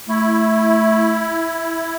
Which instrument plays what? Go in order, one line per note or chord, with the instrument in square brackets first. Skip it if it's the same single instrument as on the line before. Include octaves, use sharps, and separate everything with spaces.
[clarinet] A3 [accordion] E4